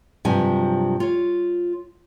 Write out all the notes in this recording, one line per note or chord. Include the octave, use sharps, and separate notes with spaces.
G2 C3 F3 F#3 G#5
F4 C#5